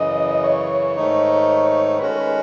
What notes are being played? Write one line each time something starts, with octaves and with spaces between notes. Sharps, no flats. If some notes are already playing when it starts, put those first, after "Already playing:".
Already playing: F#2 C#3 E3 D#5
C#5
G#2 D#3 A3 D#4
D#3 G#3 C#4 F#4 B4
A4
B4